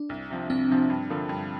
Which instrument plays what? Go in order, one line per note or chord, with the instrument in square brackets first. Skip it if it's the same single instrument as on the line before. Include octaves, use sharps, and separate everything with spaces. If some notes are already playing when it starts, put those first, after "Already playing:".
Already playing: [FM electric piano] D4
[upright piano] C2
C3 F3
[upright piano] C2 [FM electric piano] C4
[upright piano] C3 F3
G2
D3 F3 A#3
G2